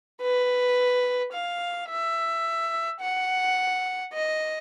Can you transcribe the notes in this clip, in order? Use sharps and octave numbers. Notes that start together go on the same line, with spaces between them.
B4
F5
E5
F#5
D#5